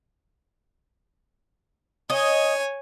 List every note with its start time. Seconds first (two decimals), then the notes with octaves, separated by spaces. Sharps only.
2.10 C#5 D#5 G#5